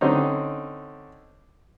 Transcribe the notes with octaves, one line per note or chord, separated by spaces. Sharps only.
D3 C4 C#4 D#4